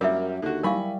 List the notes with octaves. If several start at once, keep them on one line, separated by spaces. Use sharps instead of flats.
F#2 G3 A#3 G4 A#4 E5
D#2 D3 F#4
G3 E4 A#4 F5 G#5 B5 C#6